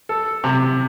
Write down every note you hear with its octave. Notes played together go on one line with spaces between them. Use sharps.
A4
C3